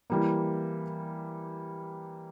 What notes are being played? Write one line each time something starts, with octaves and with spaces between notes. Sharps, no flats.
E3 G3 A#3